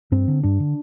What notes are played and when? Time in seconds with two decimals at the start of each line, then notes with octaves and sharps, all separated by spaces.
0.12 G2 C4
0.28 D3
0.43 G2 D4
0.60 D3